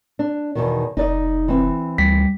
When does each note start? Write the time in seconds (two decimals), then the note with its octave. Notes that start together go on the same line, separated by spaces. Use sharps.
0.19 D4
0.55 E2 B2 D#3
0.97 F1 D#4 D5 D#5
1.48 E3 C4
1.98 D2 G3